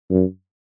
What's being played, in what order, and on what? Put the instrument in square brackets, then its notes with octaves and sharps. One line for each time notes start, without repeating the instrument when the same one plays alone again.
[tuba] F#2